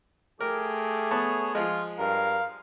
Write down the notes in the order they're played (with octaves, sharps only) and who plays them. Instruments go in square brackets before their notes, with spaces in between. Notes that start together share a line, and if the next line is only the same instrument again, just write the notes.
[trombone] A3 [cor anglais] G4 [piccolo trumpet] G#4 [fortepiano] A#4
[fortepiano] B3 A5 [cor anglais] C#5
[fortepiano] F3 G#3 [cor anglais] F4
[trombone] G2 [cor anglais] A#4 [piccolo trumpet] F5